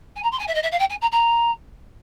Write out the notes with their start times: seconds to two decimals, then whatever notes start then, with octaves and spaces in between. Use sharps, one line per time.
0.16 G#5
0.23 A#5
0.32 C6
0.39 G#5
0.48 E5
0.55 D#5
0.63 E5
0.72 F5
0.79 G5
0.90 G#5
1.01 A#5
1.12 A#5